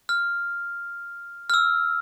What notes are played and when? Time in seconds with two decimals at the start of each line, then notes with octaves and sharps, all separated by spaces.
0.09 F6
1.50 F6
1.54 E6